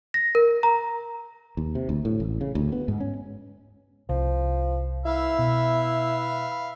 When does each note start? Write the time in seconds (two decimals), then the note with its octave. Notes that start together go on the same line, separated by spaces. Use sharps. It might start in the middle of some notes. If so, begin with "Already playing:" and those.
0.14 A#6
0.35 A#4
0.63 A#5
1.57 D#2
1.75 C3
1.89 D2
2.05 A2
2.20 A1
2.41 C#3
2.55 D2
2.72 B3
2.88 G#2
3.00 C#4
4.09 C2 F3
5.06 E4 B4 E5 F5
5.39 B2